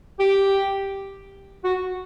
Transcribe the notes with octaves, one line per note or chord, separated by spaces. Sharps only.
G4
F#4